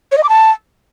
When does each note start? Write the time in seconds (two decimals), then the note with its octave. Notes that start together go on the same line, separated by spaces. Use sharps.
0.12 C#5
0.18 D#5
0.23 D6
0.29 A5